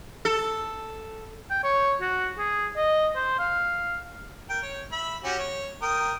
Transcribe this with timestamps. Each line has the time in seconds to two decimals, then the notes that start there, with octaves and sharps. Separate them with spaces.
0.25 A4
1.51 G5
1.63 C#5
2.01 F#4
2.38 G#4
2.77 D#5
3.16 C5
3.39 F5
4.49 A#4 G5
4.62 C#5
4.92 E5 B5
5.24 C#4 F#4 G4
5.39 C#5
5.82 A#4 G5 D#6